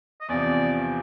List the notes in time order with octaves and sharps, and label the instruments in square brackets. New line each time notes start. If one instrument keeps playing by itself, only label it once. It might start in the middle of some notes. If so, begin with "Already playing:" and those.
[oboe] D#5
[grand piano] E2 C3 F3 [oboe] D5